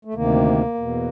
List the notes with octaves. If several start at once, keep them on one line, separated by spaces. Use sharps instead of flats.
A3
D2 C3 D#3 A#3
E2 B2